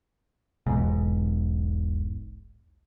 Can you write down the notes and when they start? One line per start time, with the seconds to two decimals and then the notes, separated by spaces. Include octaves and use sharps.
0.66 E1 B1 G#2